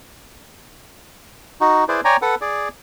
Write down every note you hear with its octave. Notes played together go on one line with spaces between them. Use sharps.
D#4 F#4
E4 G#4 B4 C5 D5
C#5 D5 G5 G#5 A#5
A4 B4 F#5
G#4 D5